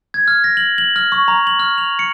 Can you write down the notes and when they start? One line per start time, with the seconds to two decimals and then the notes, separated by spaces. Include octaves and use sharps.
0.14 G#6
0.28 F6
0.44 A#6
0.57 F#7
0.78 F#7
0.96 F6
1.12 C#6
1.28 A#5
1.47 F#7
1.60 F6
1.78 F7
1.99 C#7